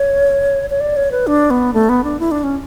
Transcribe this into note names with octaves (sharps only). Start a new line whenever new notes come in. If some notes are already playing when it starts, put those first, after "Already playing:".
Already playing: C#5
C#5
D5
C#5
B4
D4
B3
A3
B3
D4
E4
D4
C#4